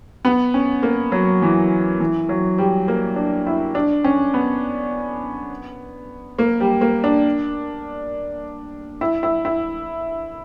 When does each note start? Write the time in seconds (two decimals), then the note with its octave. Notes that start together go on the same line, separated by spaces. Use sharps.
0.25 B3
0.54 C#4
0.83 A#3
1.12 F#3
1.42 E3
2.00 E3
2.29 F#3
2.58 G3
2.88 A#3
3.16 D4
3.47 E4
3.75 D4
4.04 C#4
4.34 B3
6.39 A#3
6.60 G3
6.81 A#3
7.04 D4
9.01 E4
9.23 E4
9.45 E4